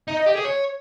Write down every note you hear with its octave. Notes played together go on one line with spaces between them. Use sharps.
D#4
D#5
G4
G#4
C#5